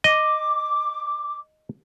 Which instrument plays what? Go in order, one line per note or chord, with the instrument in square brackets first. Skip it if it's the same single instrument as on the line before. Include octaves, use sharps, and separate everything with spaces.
[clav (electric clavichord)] D#5 [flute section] D6